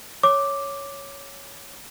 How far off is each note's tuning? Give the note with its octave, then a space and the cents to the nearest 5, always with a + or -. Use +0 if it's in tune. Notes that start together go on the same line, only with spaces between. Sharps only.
C#5 +0 D6 +0